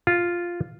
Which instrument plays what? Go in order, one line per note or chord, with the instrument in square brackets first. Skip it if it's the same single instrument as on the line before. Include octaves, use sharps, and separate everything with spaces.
[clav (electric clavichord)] F4